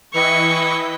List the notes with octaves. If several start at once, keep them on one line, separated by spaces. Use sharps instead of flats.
E3 E4 B4 D#5 G5 C#6